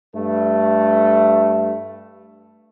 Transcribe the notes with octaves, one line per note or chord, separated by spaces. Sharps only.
G2 A3